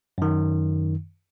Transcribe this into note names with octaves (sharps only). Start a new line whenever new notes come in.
F#2 D#3